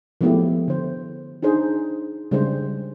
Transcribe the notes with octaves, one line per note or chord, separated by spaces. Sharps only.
F3 G#3 A3 B3 E4 G4
D3 C5
D4 D#4 G#4 C5
C#3 G3 G#3 D4 C5